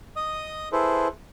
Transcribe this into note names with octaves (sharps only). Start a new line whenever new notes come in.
D#5 D#6
E4 G#4 A4 B4 C5